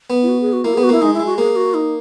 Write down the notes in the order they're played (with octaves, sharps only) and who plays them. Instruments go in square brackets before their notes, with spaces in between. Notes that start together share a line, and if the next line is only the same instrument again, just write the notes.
[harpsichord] B3
[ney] E4
F#4
G#4
F#4
[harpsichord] A#3 [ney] E4
[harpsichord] B3 [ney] G#4
[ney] F#4
[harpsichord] A#3 [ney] E4
[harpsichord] G#3 [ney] D#4
[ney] E4
[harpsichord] G#3
[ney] F#4
[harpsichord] A#3 [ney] G#4
[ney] F#4
D#4